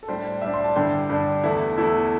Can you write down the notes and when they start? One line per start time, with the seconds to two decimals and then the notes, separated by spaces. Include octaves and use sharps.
0.03 A4
0.08 A2 G3 D4 C5
0.41 A2 G3 D4 E5
0.54 C6
0.64 A5
0.76 G2 D3 G3 D4 G5
1.10 G2 D3 G3 D4
1.44 E2 E3 A3 E4
1.78 E2 E3 A3 E4